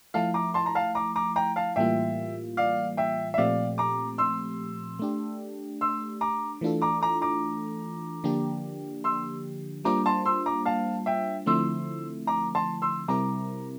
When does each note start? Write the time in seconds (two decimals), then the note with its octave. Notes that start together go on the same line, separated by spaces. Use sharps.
0.14 F3 A3 E4 F5 A5
0.34 A#5 D6
0.54 A5 C6
0.66 A#5
0.75 F5 A5
0.95 A#5 D6
1.16 A#5 D6
1.36 G5 A#5
1.56 F5 A5
1.76 A2 E3 G3 A#3 F4 E5 G5
2.57 D5 F5
2.97 E5 G5
3.34 E5
3.38 A#2 F3 A3 C4 G4 D5 F5
3.78 A#5 D6
4.18 C6 E6
4.99 A3 D4 G4
5.81 C6 E6
6.21 A#5 D6
6.61 E3 A3 D4 F4 A4
6.82 A#5 D6
7.01 A#5 D6
7.22 A#5 D6
8.24 D3 F3 A#3 D4 G4
9.04 C6 E6
9.85 G3 A#3 D4 F4 C5 A#5 D6
10.06 A5 C6
10.25 C6 E6
10.46 A#5 D6
10.65 F5 A5
11.06 E5 G5
11.46 D3 F3 A3 C4 E4 C6 E6
12.27 A#5 D6
12.55 A5 C6
12.82 C6 E6
13.08 C3 G3 C4 E4 A#4 A#5 D6